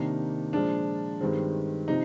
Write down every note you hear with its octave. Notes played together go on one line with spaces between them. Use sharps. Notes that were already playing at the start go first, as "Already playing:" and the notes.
Already playing: C3 D#3 A#3 D4 D#4
A#2 F3 G#3 D4
G2 D#3 G#3 C4
C3 F3 D#4